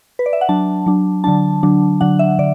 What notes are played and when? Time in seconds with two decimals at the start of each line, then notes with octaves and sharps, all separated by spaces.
0.19 B4
0.26 D5
0.33 E5
0.41 F#5
0.49 F#3 D4 A5
0.86 F#3 D4
1.24 D3 F#3 D4 A5
1.63 D3 F#3 D4
2.01 D3 F#3 D4 F#5
2.19 E5
2.39 D3 D5